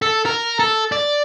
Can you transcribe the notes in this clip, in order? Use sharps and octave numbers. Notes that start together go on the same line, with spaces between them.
A4
A#4
A4
D5